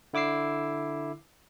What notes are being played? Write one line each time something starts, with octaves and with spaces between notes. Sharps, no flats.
D3 E4 D6 E6 C7